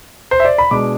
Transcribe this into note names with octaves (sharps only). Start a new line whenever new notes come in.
C5
E5
D5
B5
B2 G#3 D4 D6